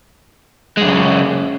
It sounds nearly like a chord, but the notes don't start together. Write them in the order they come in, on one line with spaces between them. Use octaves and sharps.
G#3 F#2 C#3